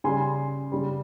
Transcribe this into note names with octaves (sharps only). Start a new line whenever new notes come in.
C#3 G3 G#5 C6
C#3 G3